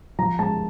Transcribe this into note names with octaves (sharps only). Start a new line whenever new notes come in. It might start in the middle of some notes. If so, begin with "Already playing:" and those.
F3 A#5
G#3 A5